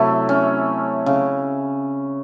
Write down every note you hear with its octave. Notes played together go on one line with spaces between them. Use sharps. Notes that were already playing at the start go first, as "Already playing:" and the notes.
Already playing: C3 F#3 A3 E4
C#4
C#3